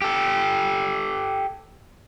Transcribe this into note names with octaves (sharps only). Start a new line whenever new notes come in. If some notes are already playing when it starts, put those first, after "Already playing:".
G4 A4